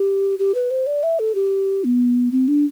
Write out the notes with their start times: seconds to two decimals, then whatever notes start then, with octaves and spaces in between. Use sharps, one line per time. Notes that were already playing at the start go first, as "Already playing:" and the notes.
Already playing: G4
0.39 G4
0.55 B4
0.71 C5
0.87 D5
1.03 E5
1.19 A4
1.35 G4
1.84 B3
2.32 C4
2.48 D4